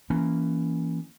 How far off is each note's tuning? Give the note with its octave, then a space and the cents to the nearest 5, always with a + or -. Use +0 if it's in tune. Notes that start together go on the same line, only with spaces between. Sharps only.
E3 +15 A#3 +0 C#4 +0